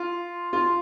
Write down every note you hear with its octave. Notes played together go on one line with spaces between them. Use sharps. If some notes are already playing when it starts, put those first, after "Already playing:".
Already playing: F4
F4